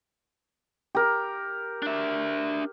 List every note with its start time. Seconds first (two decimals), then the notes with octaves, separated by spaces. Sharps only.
0.95 G4 A#4
1.82 D4 E5